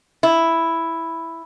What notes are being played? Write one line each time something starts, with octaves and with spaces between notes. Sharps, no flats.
E4